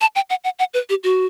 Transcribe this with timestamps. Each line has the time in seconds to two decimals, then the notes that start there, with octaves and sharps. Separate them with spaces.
0.01 A5
0.16 G5
0.30 F#5
0.44 F#5
0.59 F#5
0.74 B4
0.89 G4
1.03 F#4